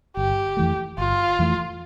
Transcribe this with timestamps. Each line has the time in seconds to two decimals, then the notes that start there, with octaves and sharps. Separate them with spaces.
0.16 G1 G4
0.57 F2 E3 A3
0.98 G1 F4
1.39 F2 E3 A3